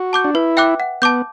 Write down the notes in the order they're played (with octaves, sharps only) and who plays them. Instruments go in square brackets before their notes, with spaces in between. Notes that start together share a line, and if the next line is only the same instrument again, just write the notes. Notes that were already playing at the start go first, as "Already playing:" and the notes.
Already playing: [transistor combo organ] F#4
[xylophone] A5 D6 G6
[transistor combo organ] D4
[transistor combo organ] E4 [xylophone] B4
[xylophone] E5 G5 D6 F#6
F#5
[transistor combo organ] B3 [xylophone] A5 D6 G6